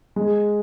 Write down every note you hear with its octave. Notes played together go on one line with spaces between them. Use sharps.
G#3